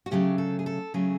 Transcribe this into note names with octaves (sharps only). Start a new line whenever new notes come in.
F#4
D2 C#3 F#3 A3 G4
A4
G#4
A4
C#3 F#3 A3 G#4